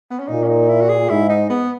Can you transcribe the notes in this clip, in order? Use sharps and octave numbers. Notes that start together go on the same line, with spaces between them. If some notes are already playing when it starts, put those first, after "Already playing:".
B3
C#4
A#2 D#4
C#4
D#4
E4
F#4
G#4
G#2 E4
D#4
B3